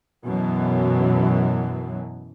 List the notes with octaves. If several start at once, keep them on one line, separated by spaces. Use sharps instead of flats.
F#2 B2 E3 F#3